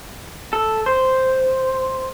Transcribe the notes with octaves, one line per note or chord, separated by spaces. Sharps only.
A4
C5